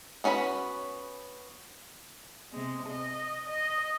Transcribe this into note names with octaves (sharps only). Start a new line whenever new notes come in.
B3 C#4 F#4 A#4 B4
C3 G#3
D#5
D#5